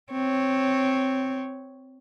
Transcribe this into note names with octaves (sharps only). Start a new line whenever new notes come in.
C4 C#5